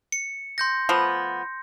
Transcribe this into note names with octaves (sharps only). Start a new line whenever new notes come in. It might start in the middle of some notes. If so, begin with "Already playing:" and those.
C#7
C6 G6 A#6
F3 A3 B3